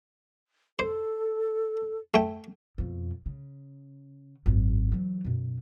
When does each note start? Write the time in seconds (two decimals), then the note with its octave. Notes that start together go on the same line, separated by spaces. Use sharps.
0.79 A4 C5
2.14 A3 G5
2.78 F2 B2
3.26 C#3
4.46 G#1 F#2
4.92 E3 F#3
5.24 F#2 B2